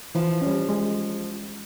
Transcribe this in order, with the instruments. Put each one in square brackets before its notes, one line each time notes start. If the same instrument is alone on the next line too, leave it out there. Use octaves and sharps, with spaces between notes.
[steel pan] E3 [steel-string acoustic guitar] F3
[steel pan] C#4
G3
G#3